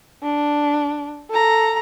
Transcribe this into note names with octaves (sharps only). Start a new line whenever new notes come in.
D4
A4 A#5